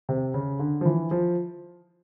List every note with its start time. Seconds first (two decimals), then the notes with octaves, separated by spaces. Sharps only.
0.09 C3
0.34 C#3
0.59 D3
0.81 F3
0.85 E3
1.11 F3